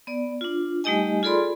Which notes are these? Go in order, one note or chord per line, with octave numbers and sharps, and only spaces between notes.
B3 D5
D4 F4
G3 A3 D#4 G4 D#5 G#5
F4 G#4 A4 D5 B5 C6